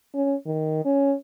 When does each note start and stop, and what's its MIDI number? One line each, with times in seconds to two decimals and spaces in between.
0.14 0.34 61
0.46 0.82 51
0.85 1.14 61